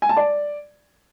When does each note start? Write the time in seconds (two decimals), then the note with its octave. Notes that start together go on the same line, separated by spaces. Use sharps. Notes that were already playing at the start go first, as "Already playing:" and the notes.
0.02 G#5
0.09 A5
0.17 D5